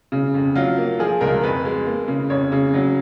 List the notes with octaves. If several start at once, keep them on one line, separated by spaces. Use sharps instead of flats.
C#3
F2
F#3 F4
A#3
F3 G#4
C#2 A#4
F2 B4
G#3
A#3
C#3
F2 C#5
C#3
F#3